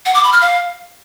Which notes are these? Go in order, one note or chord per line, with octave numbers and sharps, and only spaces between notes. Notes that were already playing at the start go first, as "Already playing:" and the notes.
F#5
D6
B5
F6
F5